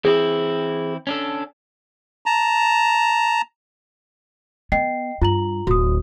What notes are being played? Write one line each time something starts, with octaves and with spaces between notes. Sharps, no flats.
E3 C4 E4 G#4
C#4 D4 A4
A5 A#5
B3 D#5 G5 C7
G2 F4 A#5 F#7
D1 F#4 D#6